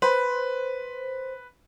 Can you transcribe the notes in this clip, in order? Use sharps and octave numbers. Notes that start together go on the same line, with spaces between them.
B4 C5 B5